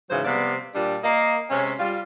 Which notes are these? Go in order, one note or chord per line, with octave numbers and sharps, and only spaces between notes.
G#2 C#3 E3 F#3 C5
C3 F3 G3 B3 D5
A#2 G3 D4
A#3 D#5
C3 G#3 C#4
G3 F4